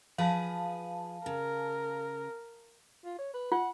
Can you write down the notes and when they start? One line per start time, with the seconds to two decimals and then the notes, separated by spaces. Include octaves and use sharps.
0.18 F3 G#4 B4 F5 A5
1.26 C#3 A#4
3.05 F4
3.19 C#5
3.34 B4
3.52 F4 F#5